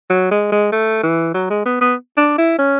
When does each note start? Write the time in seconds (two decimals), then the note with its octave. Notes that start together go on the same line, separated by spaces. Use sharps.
0.10 F#3
0.31 G#3
0.52 G#3
0.72 A3
1.03 E3
1.34 F#3
1.50 G#3
1.66 B3
1.81 B3
2.17 D4
2.38 E4
2.59 C#4